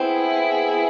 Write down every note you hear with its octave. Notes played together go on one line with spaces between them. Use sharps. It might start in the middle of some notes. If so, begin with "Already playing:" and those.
Already playing: B3 C4 E4 G#4